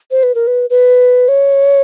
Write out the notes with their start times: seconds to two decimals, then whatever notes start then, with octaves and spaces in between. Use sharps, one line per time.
0.11 C5
0.23 B4
0.35 A#4
0.47 B4
0.70 B4
1.28 C#5